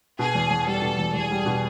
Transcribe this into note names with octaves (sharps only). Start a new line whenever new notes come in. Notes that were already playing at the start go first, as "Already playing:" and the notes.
B2 G#4
E2
E2
G3 A4
B2
E2
E2 G#4
G3
B2